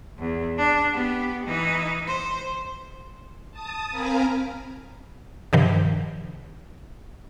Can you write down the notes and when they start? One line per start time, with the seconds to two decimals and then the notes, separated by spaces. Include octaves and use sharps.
0.19 E2
0.58 D4
0.92 B3 G4
1.46 E3 D#4
2.07 C5
3.51 A5 D#6
3.91 C4 A#4 F5 G#5 A#5 B5
5.53 G2 C3 D#3 F3